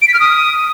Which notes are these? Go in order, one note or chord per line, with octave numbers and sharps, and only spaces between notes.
D7
B6
F6
D#6